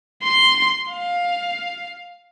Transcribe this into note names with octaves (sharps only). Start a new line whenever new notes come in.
C6
F5